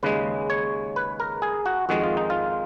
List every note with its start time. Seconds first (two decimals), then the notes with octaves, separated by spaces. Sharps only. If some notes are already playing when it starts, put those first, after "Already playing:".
0.03 D#2 C#3 G#3 B4
0.50 C#5
0.96 B4
1.20 A#4
1.42 G#4
1.66 F#4
1.89 F2 D#3 G#3 F#4
2.04 F4
2.17 D#4
2.30 F4